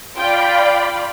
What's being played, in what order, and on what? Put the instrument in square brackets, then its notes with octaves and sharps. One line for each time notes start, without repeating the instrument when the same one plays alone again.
[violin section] F4 G5 [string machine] D5 F5 B5